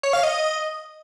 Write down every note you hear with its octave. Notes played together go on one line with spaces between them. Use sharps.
C#5
F5
D#5